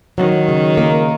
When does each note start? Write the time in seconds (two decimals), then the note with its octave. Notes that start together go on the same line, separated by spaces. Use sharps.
0.18 D#3 F#3
0.49 C#3
0.78 A#3